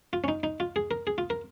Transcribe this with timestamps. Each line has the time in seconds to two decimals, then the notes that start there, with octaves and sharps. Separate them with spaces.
0.13 F4
0.24 C#4
0.28 D#4
0.43 D#4
0.60 F4
0.76 G#4
0.91 A#4
1.07 G#4
1.18 F4
1.30 A#4